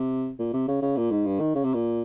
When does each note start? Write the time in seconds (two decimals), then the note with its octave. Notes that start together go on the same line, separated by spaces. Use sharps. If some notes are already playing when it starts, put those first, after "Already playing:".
Already playing: C3
0.39 A#2
0.53 C3
0.68 C#3
0.82 C#3
0.97 A#2
1.11 G#2
1.26 G2
1.40 D#3
1.55 C#3
1.64 C3
1.74 A#2